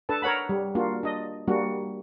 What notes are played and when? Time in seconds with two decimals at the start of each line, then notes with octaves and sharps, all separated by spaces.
0.09 D4 A4 B4 A5
0.22 A#4 C#5 F#5 B5
0.49 G3
0.75 A#3 D4 F4 F#4
1.03 D4 D#5
1.47 G3 A#3 D4 F#4